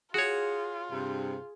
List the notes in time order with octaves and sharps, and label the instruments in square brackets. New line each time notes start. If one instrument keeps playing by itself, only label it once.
[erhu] F4 [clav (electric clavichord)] F#4 C#5 [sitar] G#4
[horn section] G2 C3